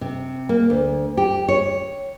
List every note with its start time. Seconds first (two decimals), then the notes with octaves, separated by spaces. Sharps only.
0.01 C3
0.49 A#3
0.70 D2
1.17 G4
1.49 C#5